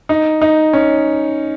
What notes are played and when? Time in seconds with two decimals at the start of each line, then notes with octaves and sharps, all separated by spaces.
0.09 D#4
0.41 D#4
0.73 C#4